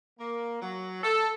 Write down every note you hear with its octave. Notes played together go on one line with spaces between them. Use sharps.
A#3
F#3
A4